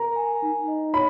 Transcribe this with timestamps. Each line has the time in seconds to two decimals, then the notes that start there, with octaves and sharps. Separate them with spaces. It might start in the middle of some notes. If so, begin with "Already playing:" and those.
Already playing: A#4 A#5
0.16 G#5
0.42 D#4
0.68 D#5
0.93 C#5 B5